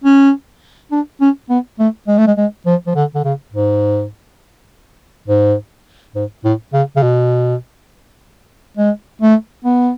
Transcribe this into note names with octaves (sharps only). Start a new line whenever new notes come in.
C#4
D4
C#4
B3
A3
G#3
A3
G#3
G#3
F3
F3
D3
D3
C#3
G#2
G#2
G#2
A2
C#3
C#3
B2
G#3
A3
B3